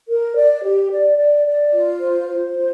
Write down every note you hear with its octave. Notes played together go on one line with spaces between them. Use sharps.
A#4
D5
G4
D5
D5
D5
F4
C5
C5
F4